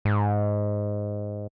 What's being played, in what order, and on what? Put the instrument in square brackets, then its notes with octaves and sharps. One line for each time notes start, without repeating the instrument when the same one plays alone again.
[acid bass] G#2